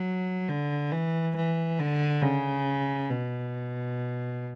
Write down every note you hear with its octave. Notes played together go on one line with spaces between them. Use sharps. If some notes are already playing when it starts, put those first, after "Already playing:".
Already playing: F#3
D3
E3
E3
D3
C#3
B2